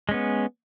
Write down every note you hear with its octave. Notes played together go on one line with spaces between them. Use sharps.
G#3 B3 C#4